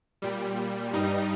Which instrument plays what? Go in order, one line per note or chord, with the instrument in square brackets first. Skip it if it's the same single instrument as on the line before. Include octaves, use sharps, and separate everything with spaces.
[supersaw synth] A#2 G3
G2 G3 D#4